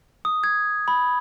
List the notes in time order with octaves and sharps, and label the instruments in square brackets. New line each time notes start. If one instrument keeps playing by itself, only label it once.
[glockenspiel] D#6
G#6
B5